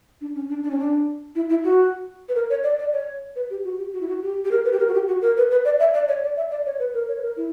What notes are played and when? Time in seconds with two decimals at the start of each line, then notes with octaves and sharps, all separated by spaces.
0.21 D4
0.35 C#4
0.49 D4
0.63 D4
0.71 C#4
0.79 D4
1.35 E4
1.50 E4
1.64 F#4
2.29 B4
2.35 A#4
2.50 C#5
2.64 D5
2.79 D5
2.93 C#5
3.36 B4
3.50 G4
3.64 F#4
3.78 G4
3.93 F#4
4.01 E4
4.08 F#4
4.22 G4
4.45 G4
4.51 A#4
4.65 B4
4.72 G4
4.79 A#4
4.88 F#4
4.94 G4
5.08 F#4
5.22 A#4
5.37 B4
5.51 B4
5.65 D5
5.80 E5
5.94 D5
6.08 C#5
6.23 D5
6.37 E5
6.51 D5
6.66 C#5
6.79 B4
6.94 A#4
7.08 C#5
7.18 B4
7.23 A#4
7.37 E4